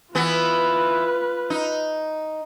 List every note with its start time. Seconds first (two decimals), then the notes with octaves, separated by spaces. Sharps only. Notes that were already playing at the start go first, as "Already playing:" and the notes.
0.15 E3 B3 F4 B4
1.50 D#4